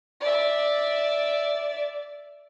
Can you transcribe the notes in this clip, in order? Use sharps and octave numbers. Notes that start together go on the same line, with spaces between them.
D5 E5